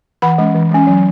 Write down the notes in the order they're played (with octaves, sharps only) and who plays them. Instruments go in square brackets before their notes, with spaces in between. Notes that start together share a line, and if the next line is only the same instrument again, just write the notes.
[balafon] E3 F#5 B5
G#3 C#4
E3
G#3 C#4
F#3